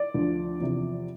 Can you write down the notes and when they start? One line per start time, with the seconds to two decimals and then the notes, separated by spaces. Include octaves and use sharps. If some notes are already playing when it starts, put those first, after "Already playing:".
Already playing: D5
0.14 D2 D3 F3
0.60 E2 C3 F3